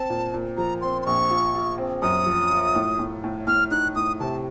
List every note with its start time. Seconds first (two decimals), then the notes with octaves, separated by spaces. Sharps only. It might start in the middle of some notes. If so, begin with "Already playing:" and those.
Already playing: C4 A5
0.10 A#2
0.34 A#2
0.57 F3 A#5
0.81 C4 C6
1.02 C6
1.06 A#1 C#6
1.31 F4
1.55 F4
1.78 C4
2.02 F#2 D#6
2.26 F3
2.51 F4
2.75 A2
2.99 A2
3.24 A2
3.47 A2 F6
3.71 D#4 F#6
3.96 A2 D#6
4.20 C3 A5